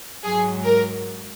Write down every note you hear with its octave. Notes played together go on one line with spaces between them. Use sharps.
G#2 F#3 G#4
A#4